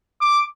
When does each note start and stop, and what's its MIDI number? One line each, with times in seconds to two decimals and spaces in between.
0.22 0.43 86